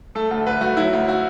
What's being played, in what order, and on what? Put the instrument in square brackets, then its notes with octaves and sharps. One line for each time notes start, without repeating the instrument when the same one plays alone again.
[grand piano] A3 A4
D2 A4
D2 B4
A3 F#4
F#3 E4
D2
F#4